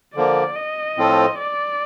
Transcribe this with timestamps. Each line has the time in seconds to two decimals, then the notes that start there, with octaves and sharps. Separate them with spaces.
0.16 D3 F3 A#3 D5
0.56 D#5
0.97 A2 F3 C4 F4 A4
1.38 D5